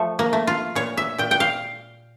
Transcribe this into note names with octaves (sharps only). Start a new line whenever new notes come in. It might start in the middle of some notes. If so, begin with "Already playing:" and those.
Already playing: F3 A3
A#3
A3
F4
A#2 C#5
E5
A#2 G5
G5
F5